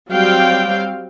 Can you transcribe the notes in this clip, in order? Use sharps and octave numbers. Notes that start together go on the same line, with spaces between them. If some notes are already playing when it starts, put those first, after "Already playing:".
F#3 G3 C4 C5 F5 G5